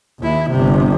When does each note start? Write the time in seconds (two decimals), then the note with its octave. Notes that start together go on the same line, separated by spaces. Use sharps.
0.20 D#2 E4
0.51 G1 C3